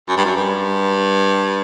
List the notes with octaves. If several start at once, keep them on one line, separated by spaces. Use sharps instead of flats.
F#2
G2
F#2
G2